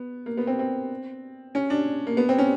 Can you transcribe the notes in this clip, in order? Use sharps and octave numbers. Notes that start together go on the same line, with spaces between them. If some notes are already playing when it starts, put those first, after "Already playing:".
Already playing: B3
A#3
B3
C4
C4
C#4
D4
A#3
B3
C4
C#4